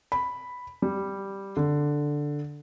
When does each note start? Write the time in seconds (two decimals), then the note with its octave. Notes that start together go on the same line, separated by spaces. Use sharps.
0.12 B5
0.82 G3
1.57 D3